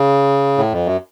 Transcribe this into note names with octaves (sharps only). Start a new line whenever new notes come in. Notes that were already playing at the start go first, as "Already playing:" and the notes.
Already playing: C#3
A2
F2
F#2